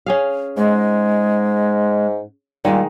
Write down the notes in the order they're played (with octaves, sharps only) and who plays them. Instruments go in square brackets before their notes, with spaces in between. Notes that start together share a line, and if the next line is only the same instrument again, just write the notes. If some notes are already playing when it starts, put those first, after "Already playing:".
[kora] C#4 G#4 F5
[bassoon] G#2 [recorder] G#3
[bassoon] A#2 [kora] D#3 G#3 [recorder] G3